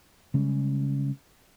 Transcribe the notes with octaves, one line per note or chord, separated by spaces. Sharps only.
C#3 G3 G#3 C#4